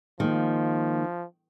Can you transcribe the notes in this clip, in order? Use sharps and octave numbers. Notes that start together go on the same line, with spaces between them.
D#3 F3 G#3 A#3